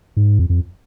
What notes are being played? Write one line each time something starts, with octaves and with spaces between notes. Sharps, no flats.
G#2
F2
F2